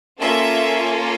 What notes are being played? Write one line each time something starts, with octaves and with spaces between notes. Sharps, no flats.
A#3 C#4 F4 A4 E5